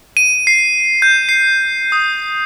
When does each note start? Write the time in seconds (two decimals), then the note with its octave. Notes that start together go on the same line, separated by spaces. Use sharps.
0.17 D#7
0.47 C7
1.02 G6
1.29 C7
1.92 D#6